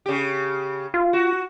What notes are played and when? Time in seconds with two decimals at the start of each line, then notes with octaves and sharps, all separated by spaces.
0.06 C#3 G4
0.94 F4
1.13 F#4